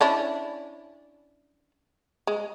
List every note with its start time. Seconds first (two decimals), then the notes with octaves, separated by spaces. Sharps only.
0.01 C#4 D4 E4
2.27 G#3